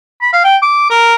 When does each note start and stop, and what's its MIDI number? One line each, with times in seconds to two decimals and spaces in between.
0.21 0.30 83
0.33 0.40 77
0.44 0.57 79
0.62 0.86 86
0.90 1.15 70